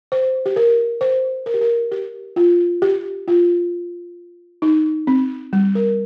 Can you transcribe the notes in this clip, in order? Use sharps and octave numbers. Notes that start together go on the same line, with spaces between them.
C5
G4
A#4
C5
A#4
G4
A#4
G4
F4
G4
F4
D#4
C4
G3
A#4